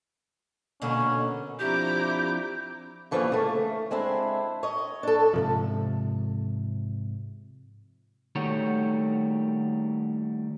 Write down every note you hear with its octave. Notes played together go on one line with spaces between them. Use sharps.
B2 D3 A#3 C#4
F3 C4 D4 E4 G4 A#5 D6 G6
D3 E3 F3 G3 A#3 C#4
C#3 A3
G#3 C4 D4 E4
C#5 D#5
D4 A4
G#2 C3 F3
D#3 G3 A3 F#4 C#5